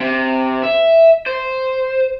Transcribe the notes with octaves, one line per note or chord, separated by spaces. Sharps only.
C3
E5
C5